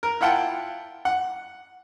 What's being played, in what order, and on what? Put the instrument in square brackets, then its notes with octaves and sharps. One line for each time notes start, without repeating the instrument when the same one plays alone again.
[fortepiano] A#4
E4 F4 F#5 G5 A5
F#5